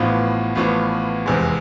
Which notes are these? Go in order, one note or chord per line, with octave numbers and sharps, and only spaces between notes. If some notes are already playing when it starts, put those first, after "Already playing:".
Already playing: A1 A2 F3 B3 F4
A1 A2 F3 B3 F4
F1 E2 C3 G#3